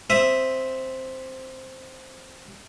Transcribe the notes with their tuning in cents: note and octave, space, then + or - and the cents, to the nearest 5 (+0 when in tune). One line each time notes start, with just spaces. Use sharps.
C4 +0 E5 +0 D#6 -10